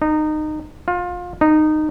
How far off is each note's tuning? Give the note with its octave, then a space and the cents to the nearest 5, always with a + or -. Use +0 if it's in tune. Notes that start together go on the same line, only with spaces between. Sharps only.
D#4 -20
F4 +25
D#4 -15